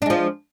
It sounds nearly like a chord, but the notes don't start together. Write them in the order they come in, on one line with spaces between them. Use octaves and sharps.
D4 G#3 F3